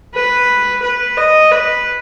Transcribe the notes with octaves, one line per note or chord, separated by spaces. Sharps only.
B4
B4
D#5
B4